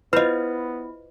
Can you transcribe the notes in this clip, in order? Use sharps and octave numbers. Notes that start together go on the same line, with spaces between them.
B3 E4 F4 B4 C5 D#5